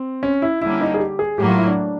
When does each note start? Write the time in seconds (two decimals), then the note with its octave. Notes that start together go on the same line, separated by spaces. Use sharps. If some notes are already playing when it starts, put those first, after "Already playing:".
Already playing: C4
0.23 C#4
0.42 E4
0.61 D3 G3 A#3 C#4 E4
0.81 D#4
0.94 G#4
1.00 G4
1.19 G#4
1.38 A2 F#3 A#3 G4
1.49 F4
1.58 E4
1.67 D4